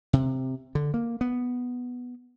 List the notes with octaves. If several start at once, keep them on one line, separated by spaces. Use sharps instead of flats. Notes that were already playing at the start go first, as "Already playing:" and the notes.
C3
D3
A#3
B3